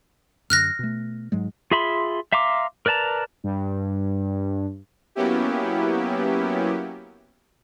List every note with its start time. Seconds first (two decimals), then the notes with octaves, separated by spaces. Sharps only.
0.50 F#2 D3 F6 F#6 A#6
0.79 B2 A3
1.32 G#2 F#3 G#3
1.71 F4 G#4 E5 B5 C6
2.32 E5 F5 A#5 C6 D6
2.86 A#4 B4 D5 A5 A#5
3.44 G2
5.15 F#3 A#3 B3 C#4 E4 G4